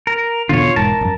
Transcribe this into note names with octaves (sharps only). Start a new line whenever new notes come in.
A#4
E2 B2 D3 F4 C#5
E1 G#2 A#4 A5
A1 F#2